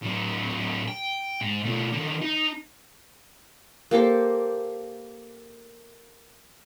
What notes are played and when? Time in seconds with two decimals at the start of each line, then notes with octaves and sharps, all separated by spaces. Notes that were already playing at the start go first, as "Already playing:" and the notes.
0.03 A2 F#3
0.88 G5
1.41 G#2
1.65 B2 A3
1.93 D3 D#3
2.22 D#4
3.91 A#3 G4 A4 C5